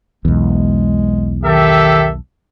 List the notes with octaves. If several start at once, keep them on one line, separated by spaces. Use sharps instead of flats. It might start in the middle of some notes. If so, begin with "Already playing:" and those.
B1 E2 G#3
D#3 G4 A4 E5